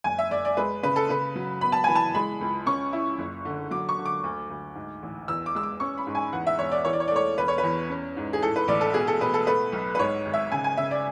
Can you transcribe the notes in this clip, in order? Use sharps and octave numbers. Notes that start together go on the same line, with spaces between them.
F#1 G#5
E5
F#1 D5
D5
G#3 B4
C#3 B4
A4
C#3 B4
F#3
B3 B5
A5
E3 G#5
A5
G#3 B5
C#2
C#4 C#6
E4
F#1
D3
F#3 D6
C#6
D3
D6
D2
D2
G#2
A1
E2 E6
D6
G#3 E6
D6
C#4 C#6
B5
G#2
G#5
E2 F#5
E5
E1 C#5
D5
E3 C#5
D5
C#5
D5
A3
C#5
E1 B4
C#5
B4
E2
C#4
G#2
G#4
A2 A4
B4
A1 D5
A4
B2 G#4
A4
B2 B4
A4
A3 B4
B1
B4
G#2 C#5
G#1
E5
C#3 G#5
G#5
C#3 E5
D5